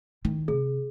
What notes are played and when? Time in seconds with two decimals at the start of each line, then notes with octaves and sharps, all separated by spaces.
0.25 D#3 E4
0.48 C3 G#4